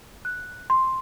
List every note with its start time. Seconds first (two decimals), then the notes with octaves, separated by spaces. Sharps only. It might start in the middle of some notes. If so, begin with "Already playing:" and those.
0.25 F#6
0.70 C6